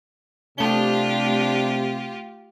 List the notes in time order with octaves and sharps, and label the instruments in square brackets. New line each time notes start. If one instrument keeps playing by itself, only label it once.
[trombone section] C3 [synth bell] A3 G7 [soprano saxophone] D4 [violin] F4 G4